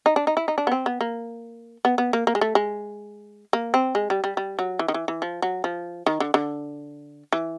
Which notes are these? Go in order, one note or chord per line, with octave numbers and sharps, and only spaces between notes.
D#4
D4
D#4
E4
D#4
D4
B3
C4
B3
A#3
B3
B3
A#3
A#3
G#3
A3
G#3
A#3
C4
G#3
G3
G3
G3
F#3
E3
D#3
E3
E3
F3
F#3
F3
D#3
D3
D3
E3